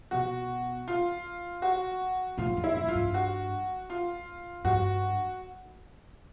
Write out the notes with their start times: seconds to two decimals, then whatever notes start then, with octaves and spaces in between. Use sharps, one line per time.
0.11 B2 F#4
0.88 F4
1.62 F#4
2.38 A2 F4
2.57 F2
2.64 E4
2.76 F#2
2.89 F4
2.95 G2
3.14 F#4
3.90 F4
4.64 G2 F#4